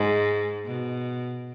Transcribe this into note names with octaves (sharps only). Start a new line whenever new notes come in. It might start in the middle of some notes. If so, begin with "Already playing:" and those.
Already playing: G#2
B2